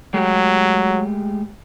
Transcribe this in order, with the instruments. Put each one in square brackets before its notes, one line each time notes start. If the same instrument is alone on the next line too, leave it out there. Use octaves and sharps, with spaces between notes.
[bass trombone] F#3 [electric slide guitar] G#3 A3 G4